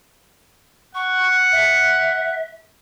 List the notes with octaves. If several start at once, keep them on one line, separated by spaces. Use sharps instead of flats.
F#5 C#6
E5